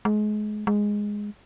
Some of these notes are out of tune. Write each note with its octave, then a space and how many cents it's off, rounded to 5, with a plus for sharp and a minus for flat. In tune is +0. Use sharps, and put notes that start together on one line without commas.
G#3 +30
G#3 -5